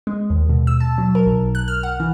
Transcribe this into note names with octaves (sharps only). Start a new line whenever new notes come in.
G#3
D#2
B2
E6
A5
F#3
A#4
B1
F#6
F6
F#5
E3